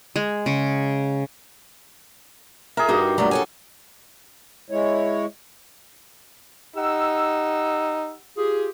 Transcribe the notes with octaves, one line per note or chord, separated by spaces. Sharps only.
G#3
C#3
G#4 A#4 E5
G2 D#4 F#4
F#3 G3 A3
A4 C#5 G#5
G#3 E4 C#5
D#4 G4 F#5 E6
F4 G4 G#4